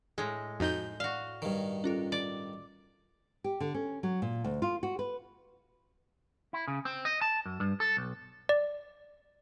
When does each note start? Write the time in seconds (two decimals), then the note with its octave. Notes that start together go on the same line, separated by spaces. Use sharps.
0.18 A2 G#3 G#4 A4
0.60 F2 D#4 F#4 G6
1.00 F#4 D5 F5
1.42 G2 D#3
1.84 C#4 F4 A4
2.12 D5
3.44 G4
3.60 D3
3.74 C#4
4.03 F#3
4.22 A#2
4.44 D2
4.62 F4
4.83 F#4
4.99 B4
6.53 E4
6.68 C#3
6.85 C4
7.05 D#5
7.22 A5
7.46 F#2
7.60 G2
7.80 A4
7.97 B1
8.49 D5